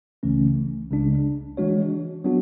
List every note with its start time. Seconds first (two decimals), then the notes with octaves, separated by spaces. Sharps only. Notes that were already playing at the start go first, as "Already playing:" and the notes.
0.23 C#2 C#3 E3 A3 C#4
0.90 C#2 C#3 G#3 D4
1.57 E3 G#3 D4 F#4 C#5
2.24 F#3 B3 D4 F#4